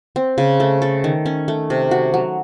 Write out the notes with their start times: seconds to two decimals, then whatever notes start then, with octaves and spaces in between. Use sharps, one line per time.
0.16 C4
0.38 C#3
0.60 A3
0.82 A4
1.04 D#3
1.26 C#4
1.48 A3
1.70 C3
1.91 F#4
2.14 F#3